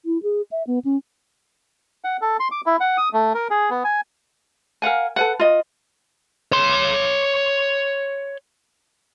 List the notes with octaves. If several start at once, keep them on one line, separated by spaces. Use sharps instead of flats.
E4
G#4
E5
B3
C#4
F#5
A4
C6
D6
E4
F#5
D#6
A3
A#4
G#4
B3
G#5
A#4 F5 F#5 G#5
A4 B4 F#5
F4 D#5
C#5 C6